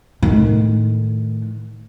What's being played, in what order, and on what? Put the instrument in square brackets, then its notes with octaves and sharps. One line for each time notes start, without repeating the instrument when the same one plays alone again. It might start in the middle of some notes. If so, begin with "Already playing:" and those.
[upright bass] A2 D#3